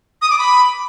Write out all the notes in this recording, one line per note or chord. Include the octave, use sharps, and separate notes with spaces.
D#6
D6
B5